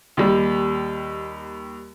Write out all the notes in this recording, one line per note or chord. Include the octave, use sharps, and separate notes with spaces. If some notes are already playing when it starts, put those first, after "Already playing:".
D#2 G3